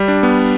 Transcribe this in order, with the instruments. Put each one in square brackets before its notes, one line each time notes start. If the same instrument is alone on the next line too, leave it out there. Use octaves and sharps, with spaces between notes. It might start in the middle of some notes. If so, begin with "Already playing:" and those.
Already playing: [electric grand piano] G3
D4
B3